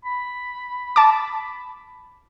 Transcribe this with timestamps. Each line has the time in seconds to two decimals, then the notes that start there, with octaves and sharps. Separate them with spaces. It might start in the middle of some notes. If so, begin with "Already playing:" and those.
0.05 B5
0.96 A5 D6